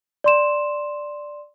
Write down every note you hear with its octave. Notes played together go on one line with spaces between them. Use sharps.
D5 C6 E7